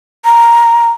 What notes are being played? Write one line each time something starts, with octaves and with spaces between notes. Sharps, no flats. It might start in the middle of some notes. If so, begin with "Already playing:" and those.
A#5